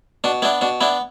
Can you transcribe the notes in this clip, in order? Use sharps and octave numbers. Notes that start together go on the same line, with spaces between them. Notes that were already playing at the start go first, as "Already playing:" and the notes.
B2 D4
B3 D4 E4
B2 D4
B3 D4 E4